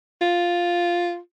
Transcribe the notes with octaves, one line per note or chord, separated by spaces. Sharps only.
F4